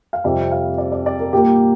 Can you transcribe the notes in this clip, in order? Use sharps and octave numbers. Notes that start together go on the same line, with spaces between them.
F5
F2 C3 G3 D5
F5
D5
D5
D5
A#4
A#2 G3 A#3 G4